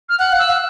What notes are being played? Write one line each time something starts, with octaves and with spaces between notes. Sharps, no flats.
F6
F#5 F#6
F5
E6
F5